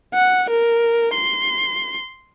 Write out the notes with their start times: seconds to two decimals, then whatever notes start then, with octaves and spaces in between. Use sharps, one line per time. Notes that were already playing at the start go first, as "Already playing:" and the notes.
0.14 F#5
0.50 A#4
1.14 C6